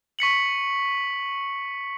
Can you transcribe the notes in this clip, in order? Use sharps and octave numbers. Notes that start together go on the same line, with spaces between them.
C#6 B6 C#7 F#7